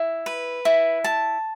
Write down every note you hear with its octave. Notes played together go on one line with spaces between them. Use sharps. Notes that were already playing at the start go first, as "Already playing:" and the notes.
Already playing: E4
B4
E4
A5